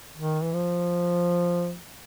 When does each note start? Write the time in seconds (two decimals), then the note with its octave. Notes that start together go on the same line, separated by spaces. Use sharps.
0.18 D#3
0.43 E3
0.53 F3